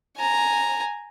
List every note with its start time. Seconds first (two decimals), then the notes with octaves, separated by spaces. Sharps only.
0.17 G#5 A#5